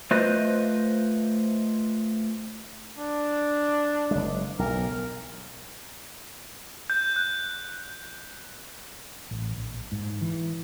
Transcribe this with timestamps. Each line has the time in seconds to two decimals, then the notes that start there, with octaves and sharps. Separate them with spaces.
0.11 A3 F4 B4 C5 D#5
2.98 D4
4.11 F#1 G#3
4.59 B1 A#4
6.90 G6
7.16 F#6
9.31 A1
9.57 A#1
9.92 G#2
10.21 E3